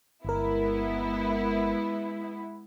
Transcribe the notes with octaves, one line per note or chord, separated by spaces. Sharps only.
G1 G#3 B3 E4 A#4